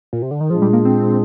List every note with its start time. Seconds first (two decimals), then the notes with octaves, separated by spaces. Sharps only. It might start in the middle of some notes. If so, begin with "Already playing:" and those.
0.13 A#2
0.22 C3
0.31 D3
0.41 D#3
0.50 A#2 F3 G#3 D4 F4 G#4
0.62 G3
0.73 A#3
0.85 C4